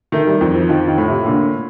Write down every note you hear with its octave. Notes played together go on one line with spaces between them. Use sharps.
D#3 A3
G3
F2 F3
F3
D#3 F3
D#3
A2
C3
A#2 D3